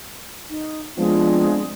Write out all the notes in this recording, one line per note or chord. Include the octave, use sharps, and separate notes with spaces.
D#4
F3 G#3 B3 C4 D4